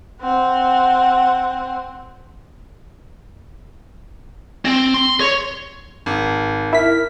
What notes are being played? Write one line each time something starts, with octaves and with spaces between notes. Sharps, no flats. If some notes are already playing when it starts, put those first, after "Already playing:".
C4 F#5
C4
C6
C#5
G#1
E4 A#4 B6